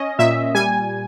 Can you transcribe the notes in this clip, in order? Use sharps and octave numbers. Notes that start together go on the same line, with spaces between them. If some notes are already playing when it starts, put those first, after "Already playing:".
Already playing: C#4 D#5
A#2 E5
G3 G#5